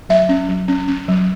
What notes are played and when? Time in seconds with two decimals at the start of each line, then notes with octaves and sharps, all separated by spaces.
0.09 F#3 E5
0.29 C#4
0.49 F#3
0.68 C#4
0.88 C#4
1.08 F#3